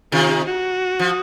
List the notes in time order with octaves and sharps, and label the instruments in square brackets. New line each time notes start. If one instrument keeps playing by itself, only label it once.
[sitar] C3 D#3 [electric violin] F4
[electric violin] F#4
[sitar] F3